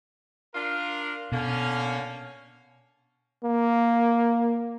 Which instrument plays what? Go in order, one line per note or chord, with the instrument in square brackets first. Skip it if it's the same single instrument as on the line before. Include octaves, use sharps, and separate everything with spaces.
[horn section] D4 F4 A#4
[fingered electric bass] B2 [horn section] D3 A#3 C#4
[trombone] A#3